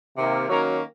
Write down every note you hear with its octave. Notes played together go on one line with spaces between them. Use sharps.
C3 D#3 A#3
D#3 F#3 A#3 C#4 A#4 C#5